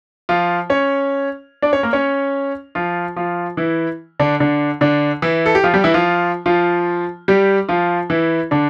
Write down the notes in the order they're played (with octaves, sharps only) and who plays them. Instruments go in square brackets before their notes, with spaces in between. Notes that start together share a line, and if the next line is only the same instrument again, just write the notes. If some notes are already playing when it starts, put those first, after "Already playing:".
[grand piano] F3 F4
C#4 C#5
D4 D5
C#4 C#5
A#3 A#4
C#4 C#5
F3 F4
F3 F4
E3 E4
D3 D4
D3 D4
D3 D4
E3 E4
A4
G4
F3 F4
G3 G4
E3 E4
F3 F4
F3 F4
G3 G4
F3 F4
E3 E4
D3 D4